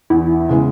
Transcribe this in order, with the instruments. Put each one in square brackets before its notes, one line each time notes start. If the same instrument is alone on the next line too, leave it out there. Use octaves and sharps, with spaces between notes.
[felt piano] E2 [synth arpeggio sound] E4
[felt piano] C#3 G#3 B3